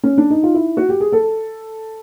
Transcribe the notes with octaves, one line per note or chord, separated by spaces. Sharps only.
C#4
D4
D#4
F4
E4
F#4
G4
G#4
A4